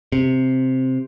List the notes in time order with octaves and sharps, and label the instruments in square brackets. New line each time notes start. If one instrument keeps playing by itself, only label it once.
[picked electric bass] C3